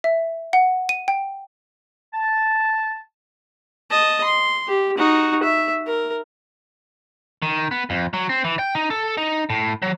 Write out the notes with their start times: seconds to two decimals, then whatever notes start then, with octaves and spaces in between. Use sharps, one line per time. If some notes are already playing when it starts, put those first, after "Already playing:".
0.04 E5
0.53 F#5
0.89 D#7
1.08 G5
2.14 A5
3.90 D#5 A5
4.24 C6
4.68 G4
4.98 D#4 F#4
5.43 E5
5.87 A#4
7.42 D#3
7.71 B3
7.90 F2
8.13 F#3
8.29 C4
8.44 E3
8.59 G5
8.75 D#4
8.90 A4
9.17 D#4
9.50 A2
9.82 F#3